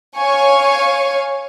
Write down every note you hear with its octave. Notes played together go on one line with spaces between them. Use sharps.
C#5 F5 G#5 C#6